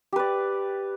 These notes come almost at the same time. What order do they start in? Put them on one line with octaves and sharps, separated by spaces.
G4 B4 D5